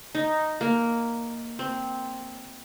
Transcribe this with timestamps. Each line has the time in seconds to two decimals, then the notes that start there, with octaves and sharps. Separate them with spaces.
0.15 D#4
0.61 A#3
1.59 C4